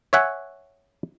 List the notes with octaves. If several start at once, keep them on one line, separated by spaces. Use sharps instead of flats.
C#5 E5 F#5 G#5